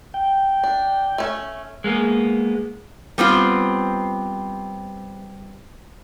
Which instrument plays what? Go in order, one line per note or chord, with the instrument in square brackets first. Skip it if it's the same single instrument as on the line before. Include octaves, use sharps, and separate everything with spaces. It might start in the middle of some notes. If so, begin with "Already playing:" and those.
[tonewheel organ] G5
[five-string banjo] D4
A3 C#4
[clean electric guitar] G#3 A#3 B3
[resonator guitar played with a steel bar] G3 B3 C4 F4